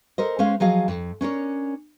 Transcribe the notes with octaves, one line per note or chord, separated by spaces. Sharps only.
A4 A#4 C5 D#5
G#3 C#4 C5 F5
F3 F#3 G#4 D#5 F5
F2
C#4 D4 A#4 C#5